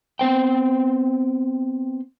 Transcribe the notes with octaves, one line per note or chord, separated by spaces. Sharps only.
B3 C4 C5 G5